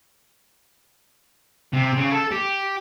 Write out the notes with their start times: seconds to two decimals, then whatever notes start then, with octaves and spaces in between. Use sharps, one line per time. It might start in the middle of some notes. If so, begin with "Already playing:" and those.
1.73 C3
1.97 C#3
2.12 A4
2.31 G4